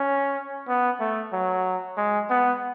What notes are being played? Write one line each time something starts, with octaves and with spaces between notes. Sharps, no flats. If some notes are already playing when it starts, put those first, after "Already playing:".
Already playing: C#4
B3
A3
F#3
G#3
B3